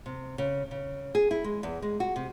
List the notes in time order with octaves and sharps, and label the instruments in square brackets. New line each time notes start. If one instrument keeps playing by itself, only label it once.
[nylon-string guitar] C3
C#3
C#3
G#4
E4
G#3
E2
G#3
F#4
C3